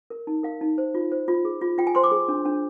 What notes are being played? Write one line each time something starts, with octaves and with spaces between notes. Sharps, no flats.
A#4
D#4
A#4 F5
D#4
C5
F4
C5
F4
G#4
F4
F4 G5
G#5
C5 C6
D6
G#4
D4
D4